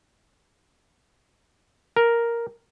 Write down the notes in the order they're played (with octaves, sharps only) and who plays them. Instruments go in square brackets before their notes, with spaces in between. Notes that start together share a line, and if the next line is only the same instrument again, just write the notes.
[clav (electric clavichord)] A#4